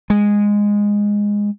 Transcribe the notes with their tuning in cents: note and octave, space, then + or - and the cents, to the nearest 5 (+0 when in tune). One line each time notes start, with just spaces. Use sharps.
G#3 -10